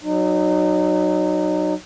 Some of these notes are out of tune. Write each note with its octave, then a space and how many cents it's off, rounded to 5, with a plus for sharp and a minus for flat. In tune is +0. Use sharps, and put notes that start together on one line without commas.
F#3 +0 D#4 -30